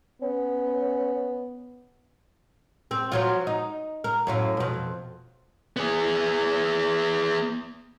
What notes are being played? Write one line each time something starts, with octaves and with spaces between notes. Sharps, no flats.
B3 C#4
C4
F3 F#3 F4
D#4
A#4
F#2 A2 F4
F2 B2
B3 G#4